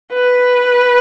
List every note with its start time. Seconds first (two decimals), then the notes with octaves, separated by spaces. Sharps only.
0.13 B4